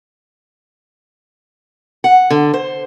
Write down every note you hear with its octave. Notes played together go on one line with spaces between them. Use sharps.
F#5
D3
C5